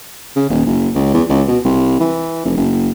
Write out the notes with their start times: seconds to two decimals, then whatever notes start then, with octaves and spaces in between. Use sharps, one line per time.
0.36 C#3
0.49 D#1
0.66 F#1
0.95 C#2
1.14 E2
1.30 C#2
1.48 B2
1.64 C2
2.01 E3
2.45 F1
2.57 F#1